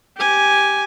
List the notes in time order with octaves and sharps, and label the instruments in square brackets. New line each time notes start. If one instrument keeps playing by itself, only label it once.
[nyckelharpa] G4 G#5